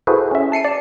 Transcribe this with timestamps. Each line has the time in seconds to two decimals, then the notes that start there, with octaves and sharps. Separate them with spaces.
0.07 E4 F#4 G#4 A4 B4 C5
0.31 C#4 E5
0.52 A5 C7 C#7 D#7
0.65 D5 A5